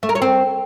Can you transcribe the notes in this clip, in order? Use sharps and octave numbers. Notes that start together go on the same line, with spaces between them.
A3
A#4
C#5
C4